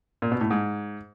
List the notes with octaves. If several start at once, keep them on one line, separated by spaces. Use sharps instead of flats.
A#2
B2
A2
G#2